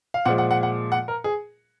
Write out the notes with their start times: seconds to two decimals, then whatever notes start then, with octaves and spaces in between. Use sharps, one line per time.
0.14 F5
0.25 A#2 F3 G#3 F#5
0.38 F#5
0.51 F#5
0.63 F#5
0.92 F#5
1.08 A#4
1.24 G#4